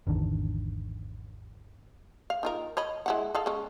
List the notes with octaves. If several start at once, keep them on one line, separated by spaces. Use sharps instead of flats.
G#1 E2 D3 D#3
F5
D#4 F4 A#4
C#5 D#5 B5
G#3 E4 F#5
G#4 A4 F5
G#3 C#4